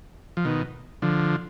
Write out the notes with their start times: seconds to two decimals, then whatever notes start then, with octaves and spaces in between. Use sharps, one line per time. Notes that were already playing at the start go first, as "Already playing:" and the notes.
0.37 F3
0.45 B2 D#3
1.02 D3 F3